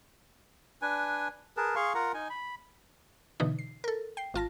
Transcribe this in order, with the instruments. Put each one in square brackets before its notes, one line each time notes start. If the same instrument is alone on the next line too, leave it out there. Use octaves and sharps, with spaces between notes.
[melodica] D4 B4 G#5
G#4 A#4 B4 A5
G#4 F5 C6 C#6
F4 A#4 F#5 A#5
D#4 G#5
B5
[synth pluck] B2 D3 E3 D#4
C7
A4 A#4
G5 C7
G#1 F4 A5 A#6